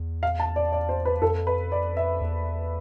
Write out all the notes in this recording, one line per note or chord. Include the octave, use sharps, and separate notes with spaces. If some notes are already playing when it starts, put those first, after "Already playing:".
Already playing: E2
F5
A5
D5
D5
C5
B4
F2 A4
B4
D5
E5
E2